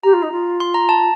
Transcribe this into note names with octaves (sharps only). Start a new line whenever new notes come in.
G4 A#5
F4
D#4
F4
C6
A#5
A5